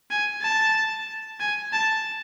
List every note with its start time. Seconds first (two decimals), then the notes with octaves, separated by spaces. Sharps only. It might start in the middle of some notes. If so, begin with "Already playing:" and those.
0.11 G#5
0.43 A5
1.40 G#5
1.73 A5